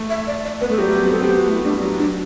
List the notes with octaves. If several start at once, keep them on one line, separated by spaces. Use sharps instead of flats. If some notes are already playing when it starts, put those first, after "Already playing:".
Already playing: A3
E5
D5
D5
B3 B4
A3 A4
F#3 G4
G3
B3
C4
B3 A4
C4 G4
B3
F#4
A3 E4
G3 D4
F#3
F#3 D4